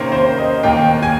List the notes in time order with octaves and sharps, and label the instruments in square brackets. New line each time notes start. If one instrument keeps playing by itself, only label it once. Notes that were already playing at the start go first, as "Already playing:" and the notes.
Already playing: [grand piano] C3 D#3 A#3 C#4 [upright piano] C5
[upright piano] C5
D#5
[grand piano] D#2 D#3 A#3 [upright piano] G5
[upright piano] G#5